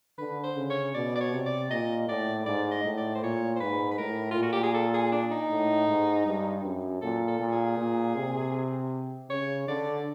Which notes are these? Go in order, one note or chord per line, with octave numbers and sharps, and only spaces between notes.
D3 B4
C5
C#3
C#5
B2 D5
D5
C#5
C3
D5
A#2 D#5
A2 D5
G#2 D5
D#5
A2
D5
C5
A#2 C#5
C5
G#2 B4
B4
A2 A#4
A#2 F4
F#4
G4
G#4
A4
G#4
D4
D#4
A2
G#2
G2
F#2
A#2 A4
A4
A#2
G#4
A#2
C3
C#3 C#5
D3 D5